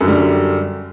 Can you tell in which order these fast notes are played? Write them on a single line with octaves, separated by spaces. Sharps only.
F#2 D3 G3